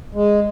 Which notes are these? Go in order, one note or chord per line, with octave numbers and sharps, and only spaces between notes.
G#3